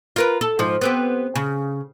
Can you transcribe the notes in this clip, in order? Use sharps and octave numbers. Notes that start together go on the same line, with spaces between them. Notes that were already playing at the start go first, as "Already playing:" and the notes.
F4 A#4 B4
A4
G#2 F3
B3 C4 G4
C#3